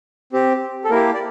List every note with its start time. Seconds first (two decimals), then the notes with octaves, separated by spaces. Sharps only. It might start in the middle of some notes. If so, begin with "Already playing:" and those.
0.33 C4 G4
0.85 A4
0.90 A#3 E4 G4 A#4
1.14 D5